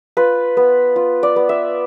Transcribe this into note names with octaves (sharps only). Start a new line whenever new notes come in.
F4 B4
B3
F4
D5
B3
E5